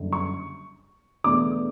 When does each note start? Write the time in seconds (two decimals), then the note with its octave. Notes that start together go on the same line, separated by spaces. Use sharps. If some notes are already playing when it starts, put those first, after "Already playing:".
Already playing: F#1 F#2 D3 G3
0.13 C#6
1.24 E1 E2 B2 A3 D4 D6